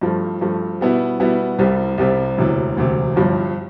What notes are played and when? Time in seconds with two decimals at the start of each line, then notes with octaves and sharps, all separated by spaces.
0.01 G2 F3 A3
0.41 G2 F3 A3
0.81 B2 G3 B3 E4
1.19 B2 G3 B3 E4
1.58 C2 C3 G3 C4
1.98 C2 C3 G3 C4
2.37 E1 D2 C3 E3
2.76 E1 D2 C3 E3
3.16 G1 G2 F3